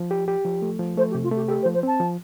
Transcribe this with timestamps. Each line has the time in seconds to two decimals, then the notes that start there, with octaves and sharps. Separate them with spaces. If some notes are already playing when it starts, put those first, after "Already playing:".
Already playing: F3
0.11 G4
0.28 G4
0.45 F3
0.62 A3
0.79 F3
0.97 A3 C5
1.10 G4
1.15 C3
1.23 F4
1.31 A3 G4
1.48 G4 A4
1.62 C5
1.65 F3
1.74 C5
1.83 C4 A5
2.00 F3